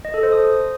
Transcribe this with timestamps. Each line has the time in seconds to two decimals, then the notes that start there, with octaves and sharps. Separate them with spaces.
0.05 D#5
0.14 A4
0.23 C5
0.32 D#6